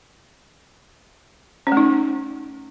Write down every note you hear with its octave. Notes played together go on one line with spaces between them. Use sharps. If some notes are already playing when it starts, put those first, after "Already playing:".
C#4
A3
D#4